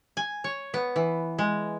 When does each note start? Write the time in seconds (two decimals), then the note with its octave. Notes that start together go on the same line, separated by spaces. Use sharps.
0.17 G#5
0.44 C#5
0.74 B3
0.96 E3
1.38 G#3